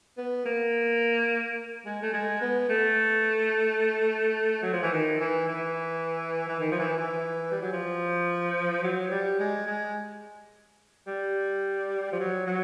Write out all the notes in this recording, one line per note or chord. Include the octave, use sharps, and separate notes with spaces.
B3
A#3
G#3
A3
G#3
B3
A3
F#3
F3
E3
D#3
E3
E3
E3
D#3
F3
E3
E3
G3
F#3
F3
F#3
G3
G#3
G#3
G3
F3
F#3
F#3